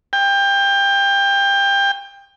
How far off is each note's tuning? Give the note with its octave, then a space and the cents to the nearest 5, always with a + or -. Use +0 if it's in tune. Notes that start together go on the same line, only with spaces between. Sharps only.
G5 +20